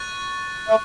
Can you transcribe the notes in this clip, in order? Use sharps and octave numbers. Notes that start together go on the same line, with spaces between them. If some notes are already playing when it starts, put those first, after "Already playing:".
Already playing: C#6 F#6 A6
A3